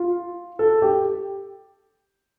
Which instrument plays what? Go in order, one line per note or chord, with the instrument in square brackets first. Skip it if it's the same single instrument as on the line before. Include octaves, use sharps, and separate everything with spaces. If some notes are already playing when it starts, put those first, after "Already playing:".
Already playing: [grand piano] F4
A4
G4